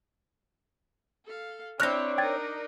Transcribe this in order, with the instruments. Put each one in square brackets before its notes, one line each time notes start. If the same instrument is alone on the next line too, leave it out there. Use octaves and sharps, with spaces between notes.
[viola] A4 F5
[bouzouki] C4 C#5 [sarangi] D4 [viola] E4 [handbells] F6 F#6 A#6
[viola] D#4 A#4 [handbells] G5 G#6 A6